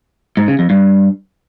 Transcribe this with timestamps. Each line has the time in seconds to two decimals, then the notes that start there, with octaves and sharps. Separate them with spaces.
0.37 G#2
0.48 C#3
0.59 F2
0.70 G2